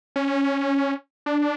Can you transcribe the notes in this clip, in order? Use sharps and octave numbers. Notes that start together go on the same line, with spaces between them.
C#4
D4